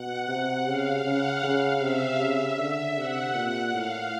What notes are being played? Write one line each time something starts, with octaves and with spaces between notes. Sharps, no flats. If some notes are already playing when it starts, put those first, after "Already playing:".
Already playing: B2 F#5
C3
C#3 F5
C#3 F#5
C#3 F5
C3 E5
C#3
D3
C3 F#5
A#2
A2 F5